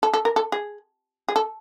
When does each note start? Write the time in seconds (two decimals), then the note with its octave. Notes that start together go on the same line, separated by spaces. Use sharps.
0.03 A4
0.14 A4
0.25 A#4
0.36 A4
0.52 G#4
1.29 G#4
1.36 A4